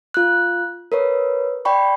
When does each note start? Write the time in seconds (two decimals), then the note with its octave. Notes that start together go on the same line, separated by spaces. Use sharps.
0.14 F4 F#6
0.92 A#4 B4 C#5
1.65 D5 G5 B5 C#6